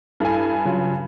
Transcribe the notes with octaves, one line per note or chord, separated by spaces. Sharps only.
G2 E4 A4 G#5
C#3 F#3 F4